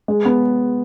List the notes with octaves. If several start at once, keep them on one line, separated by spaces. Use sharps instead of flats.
G#3
B3